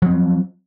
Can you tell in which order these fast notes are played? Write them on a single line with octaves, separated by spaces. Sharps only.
F3 C4 F#3